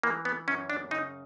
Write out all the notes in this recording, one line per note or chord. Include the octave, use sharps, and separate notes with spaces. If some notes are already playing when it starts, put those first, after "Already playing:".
E3 A#3
B3
F#2 C#4
D4
C#3 D#4